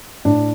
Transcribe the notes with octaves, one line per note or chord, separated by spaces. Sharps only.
A2 D4